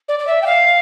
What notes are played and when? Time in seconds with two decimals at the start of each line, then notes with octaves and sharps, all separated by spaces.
0.08 D5
0.19 D5
0.27 E5
0.42 G5
0.46 F5